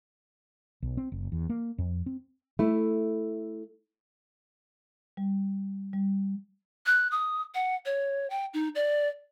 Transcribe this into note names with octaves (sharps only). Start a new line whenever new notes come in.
B1
C4
F#1
E2
A#3
F2
C4
A3 E4
G3
G3
F#6
D#6
F#5
C#5
G5
D#4
D5